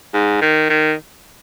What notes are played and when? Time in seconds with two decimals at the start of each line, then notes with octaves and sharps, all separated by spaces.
0.14 G#2
0.42 D#3
0.70 D#3